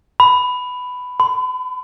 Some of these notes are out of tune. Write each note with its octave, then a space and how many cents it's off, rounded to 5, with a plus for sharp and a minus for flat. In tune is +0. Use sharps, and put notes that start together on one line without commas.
B5 +10
B5 +40